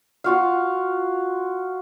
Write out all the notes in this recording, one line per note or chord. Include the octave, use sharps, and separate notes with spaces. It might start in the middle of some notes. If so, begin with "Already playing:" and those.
F4 F#4 F5